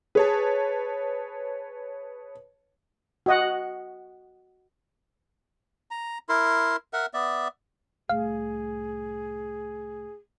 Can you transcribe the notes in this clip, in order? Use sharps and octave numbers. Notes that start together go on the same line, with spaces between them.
G#4 B4 C#5 A5
F#4 D#5 F#5
A#5
E4 A#4 C6
A#4 E5 F#5
B3 D5 E5
C2 A2 G#4 F5